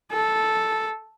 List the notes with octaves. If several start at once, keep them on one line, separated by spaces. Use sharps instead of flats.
A4